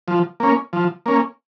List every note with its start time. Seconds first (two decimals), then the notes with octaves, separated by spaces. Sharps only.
0.08 F3
0.40 A#3 C#4
0.73 F3
1.06 A#3 C#4